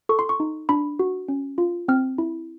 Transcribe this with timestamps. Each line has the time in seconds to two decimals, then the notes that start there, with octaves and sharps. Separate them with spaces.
0.09 A4 C#6
0.19 C6
0.29 C#6
0.40 D#4
0.69 D4 B5
0.99 F#4
1.28 C#4
1.58 F4
1.88 C4 F6
2.18 E4